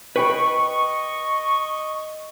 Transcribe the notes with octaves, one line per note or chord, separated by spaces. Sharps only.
B4 D#5 G5 B5 C#6